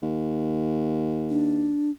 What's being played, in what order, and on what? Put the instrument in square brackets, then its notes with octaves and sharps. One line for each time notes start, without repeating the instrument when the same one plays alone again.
[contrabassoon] D#2
[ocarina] D4